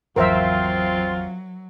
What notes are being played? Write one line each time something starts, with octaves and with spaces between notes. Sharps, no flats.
G#1 E2 F#3 C4 F4 A#4 C5 E5